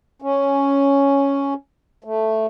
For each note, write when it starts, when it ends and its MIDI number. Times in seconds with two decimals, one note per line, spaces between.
0.22 1.54 61
2.04 2.47 57